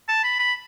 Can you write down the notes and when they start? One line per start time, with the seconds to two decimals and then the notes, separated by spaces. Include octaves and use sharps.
0.08 A5
0.24 B5
0.39 B5